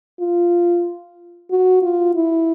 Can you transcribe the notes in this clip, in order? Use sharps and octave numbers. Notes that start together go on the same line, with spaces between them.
F4
F#4
F4
E4